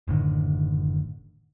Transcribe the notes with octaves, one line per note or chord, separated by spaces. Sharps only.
F#1 A2 D3 D#3